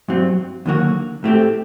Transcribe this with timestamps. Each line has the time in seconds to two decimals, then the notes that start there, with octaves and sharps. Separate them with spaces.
0.08 G2 F#3 C4
0.66 D#2 D3 F#3 A#3 F#4
1.24 A2 A3 C4 G4